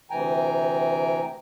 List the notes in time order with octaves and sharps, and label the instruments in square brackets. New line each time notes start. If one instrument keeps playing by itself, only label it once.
[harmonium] D2 C3 E3 G5 G#5 A#5